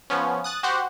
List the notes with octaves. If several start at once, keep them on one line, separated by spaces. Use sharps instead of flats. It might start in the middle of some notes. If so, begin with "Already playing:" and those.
F3 B3 C#4
D#6 F#6 A6
F#4 G4 C5 F#5